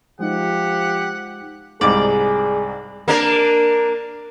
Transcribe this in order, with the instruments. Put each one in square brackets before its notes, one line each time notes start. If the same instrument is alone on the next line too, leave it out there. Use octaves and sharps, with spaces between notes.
[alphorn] F3 [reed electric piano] G#3 D#4 [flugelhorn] G4 [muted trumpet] F#5
[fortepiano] C2 G#2 [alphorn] G#4 [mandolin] D5
[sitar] A#3 D4 A#4